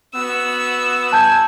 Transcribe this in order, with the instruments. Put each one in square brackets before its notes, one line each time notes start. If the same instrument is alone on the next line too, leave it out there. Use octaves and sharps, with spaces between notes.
[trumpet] B3 [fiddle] F#4 E6
[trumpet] G#5 [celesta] A5 G6